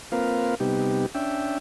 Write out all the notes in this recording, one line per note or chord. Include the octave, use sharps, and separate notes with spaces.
A#3 C4 F4 A#4 B4 F5
C3 G3 B3 D#4 G4
C#4 D4 E5 G5